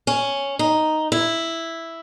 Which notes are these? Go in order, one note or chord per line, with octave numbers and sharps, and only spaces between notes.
C#4
D#4
E4